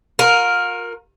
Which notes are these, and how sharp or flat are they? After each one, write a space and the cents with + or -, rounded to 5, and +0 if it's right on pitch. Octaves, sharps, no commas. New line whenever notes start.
F4 +40 A#4 +0